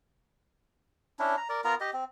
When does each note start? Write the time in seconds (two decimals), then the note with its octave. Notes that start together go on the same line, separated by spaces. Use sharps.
1.19 C#4 D4 E4
1.37 A#5
1.49 A#4 D5
1.64 B3 F4 A#4 A#5
1.81 G4 D#5
1.93 C4